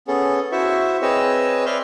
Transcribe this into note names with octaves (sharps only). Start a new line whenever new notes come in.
B3 C#4 G#4 A4
E4 F#4 C5 E5 C#6
C4 G#4 B4 C#5 D#5 E6
B4 C#5 D5 E5 C6 F6